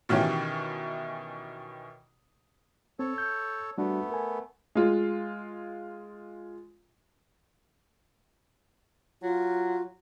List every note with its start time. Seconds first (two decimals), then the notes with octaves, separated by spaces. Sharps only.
0.09 B2 D#3 E3 C#4 G4
2.99 C4 A4 C#5
3.18 G6
3.78 G3 A3 B3 D4 F#4
4.10 A#4 G#5
4.75 G#3 F4
9.23 F#3 F4